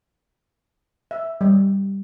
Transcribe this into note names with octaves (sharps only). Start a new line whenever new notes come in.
E5
G3